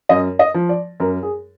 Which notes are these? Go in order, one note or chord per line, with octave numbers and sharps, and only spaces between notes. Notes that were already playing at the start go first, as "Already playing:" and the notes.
F#2 D#5
D#5
F3
D5
F#2 A#4
G#4